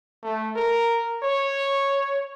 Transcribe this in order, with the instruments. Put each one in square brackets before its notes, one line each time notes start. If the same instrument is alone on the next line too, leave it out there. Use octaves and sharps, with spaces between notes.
[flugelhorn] A3
A#4
C#5